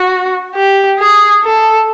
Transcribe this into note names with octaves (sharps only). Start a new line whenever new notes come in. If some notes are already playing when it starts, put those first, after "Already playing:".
Already playing: F#4
G4
G#4
A4